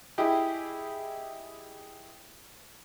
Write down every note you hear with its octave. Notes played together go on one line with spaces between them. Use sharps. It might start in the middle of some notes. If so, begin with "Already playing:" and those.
E4 G4 G#4 D#5 G5